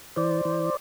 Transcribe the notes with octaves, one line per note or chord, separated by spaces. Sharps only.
E3 C5 D5
E3